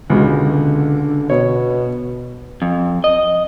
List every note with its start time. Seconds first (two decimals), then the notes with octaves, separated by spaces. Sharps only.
0.10 C#2 B2 D3 G#3
1.30 B2 C#5
2.62 F2
3.04 D#5